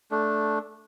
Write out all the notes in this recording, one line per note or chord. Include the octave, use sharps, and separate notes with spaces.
A3 D4